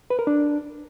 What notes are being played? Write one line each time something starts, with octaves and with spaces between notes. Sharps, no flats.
B4
A#4
D4